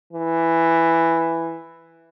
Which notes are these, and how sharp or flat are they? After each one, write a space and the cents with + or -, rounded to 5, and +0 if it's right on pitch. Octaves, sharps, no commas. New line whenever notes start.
E3 +5